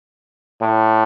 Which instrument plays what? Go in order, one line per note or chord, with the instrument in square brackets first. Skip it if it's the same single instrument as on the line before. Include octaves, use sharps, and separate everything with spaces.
[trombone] A2